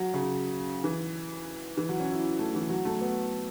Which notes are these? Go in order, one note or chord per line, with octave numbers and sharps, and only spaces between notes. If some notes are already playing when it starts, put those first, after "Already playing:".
Already playing: F#3
C#3
E3
E3
F#3
C#4
E4
A3
E3
F#3
A3
B3